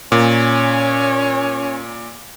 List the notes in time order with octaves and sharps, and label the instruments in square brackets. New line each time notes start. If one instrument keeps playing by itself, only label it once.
[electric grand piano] A#2 [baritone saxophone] C#4